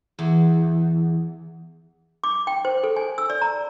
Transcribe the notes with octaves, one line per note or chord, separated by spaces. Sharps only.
E2
D6
G5
C5
A4
G#5
E6
D5
A#5